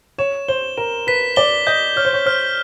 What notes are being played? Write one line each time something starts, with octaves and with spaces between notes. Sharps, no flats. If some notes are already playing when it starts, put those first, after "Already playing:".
C#5 E7
C5 G7
A#4 E7
B4 B6
D5 G7
D#5 G6
C#5 F6
C5
C#5
C5 F6